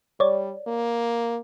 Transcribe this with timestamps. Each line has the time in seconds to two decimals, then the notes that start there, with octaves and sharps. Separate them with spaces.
0.20 G3 C#5 D5
0.67 A#3